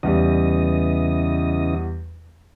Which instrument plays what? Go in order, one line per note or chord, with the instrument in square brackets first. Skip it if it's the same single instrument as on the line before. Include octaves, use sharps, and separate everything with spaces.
[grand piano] E2 G3 [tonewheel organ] C#3 E3 D#5